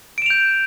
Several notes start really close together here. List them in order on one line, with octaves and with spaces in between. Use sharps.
D7 E7 F7 G6